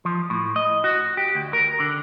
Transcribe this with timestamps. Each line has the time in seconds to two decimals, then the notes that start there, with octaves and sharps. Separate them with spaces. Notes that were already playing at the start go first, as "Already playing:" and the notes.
0.05 F3
0.30 A2
0.56 D#5
0.84 F#4
1.17 G4
1.35 D2
1.53 A#4
1.80 D3